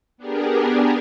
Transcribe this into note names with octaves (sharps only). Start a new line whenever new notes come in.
B3 D4 G4 G#4 A#4